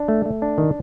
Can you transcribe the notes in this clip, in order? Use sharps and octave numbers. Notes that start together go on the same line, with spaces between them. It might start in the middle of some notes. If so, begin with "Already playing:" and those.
Already playing: D4
A3
A3
D4
D#3